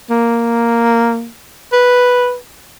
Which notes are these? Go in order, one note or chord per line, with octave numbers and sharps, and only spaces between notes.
A#3
B4